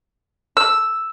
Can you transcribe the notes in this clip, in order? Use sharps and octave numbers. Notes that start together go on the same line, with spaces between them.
E6